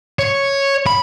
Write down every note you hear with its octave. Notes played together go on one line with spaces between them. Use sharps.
C#5
B5